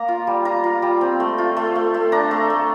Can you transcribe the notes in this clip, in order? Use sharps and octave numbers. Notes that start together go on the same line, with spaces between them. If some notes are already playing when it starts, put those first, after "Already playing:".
Already playing: A#3 A#5
F4
G3
F4 A#5
F4
G3
C4
A3
F4
A3
A3
A3
D4 A#5
A3
A3